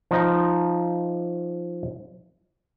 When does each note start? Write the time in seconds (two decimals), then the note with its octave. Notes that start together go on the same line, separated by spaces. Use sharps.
0.11 F3 D#4